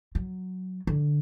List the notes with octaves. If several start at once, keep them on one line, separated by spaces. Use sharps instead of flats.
F#3
D3